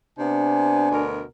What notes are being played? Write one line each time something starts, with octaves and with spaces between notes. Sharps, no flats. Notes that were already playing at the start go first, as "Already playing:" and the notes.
C3 B3 D4 G#5
D2 B2 A#4